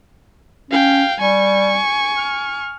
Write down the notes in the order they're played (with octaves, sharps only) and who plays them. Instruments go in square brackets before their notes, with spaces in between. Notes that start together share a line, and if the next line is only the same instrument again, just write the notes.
[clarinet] C#4 [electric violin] F5 G5
[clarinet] G3 [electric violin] G#5 C#6
[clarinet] F6